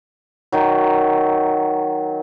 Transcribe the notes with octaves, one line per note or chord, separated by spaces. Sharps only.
D#3 F#3